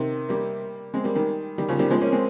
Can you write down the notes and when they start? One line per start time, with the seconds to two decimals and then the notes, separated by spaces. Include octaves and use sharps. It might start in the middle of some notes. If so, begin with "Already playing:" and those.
Already playing: C3 D#3
0.29 G3 A#3
0.94 G#3 C4
1.04 G3 A#3
1.15 D#3 G3
1.58 D#3 G3
1.68 C#3 F3
1.79 D#3 G3
1.90 F3 G#3
2.01 A#3 C#4
2.12 G#3 C4